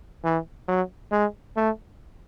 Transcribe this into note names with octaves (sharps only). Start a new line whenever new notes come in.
E3
F#3
G#3
A3